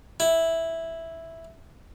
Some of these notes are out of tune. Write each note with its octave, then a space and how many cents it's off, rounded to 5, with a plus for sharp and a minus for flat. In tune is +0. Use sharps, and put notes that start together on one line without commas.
E4 -5